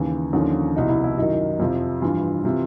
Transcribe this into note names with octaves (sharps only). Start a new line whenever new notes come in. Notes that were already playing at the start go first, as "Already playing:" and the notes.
Already playing: D#2 C#3 E3
D#2 D3 F3 C#4
C2 B2 D#4
E4
E4
F#2 D#3 D#4
F2 C3 F3
G2 E3 F4
C3 E3 F4